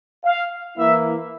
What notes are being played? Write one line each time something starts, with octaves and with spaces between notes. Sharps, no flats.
F5
E3 A#3 E4 E5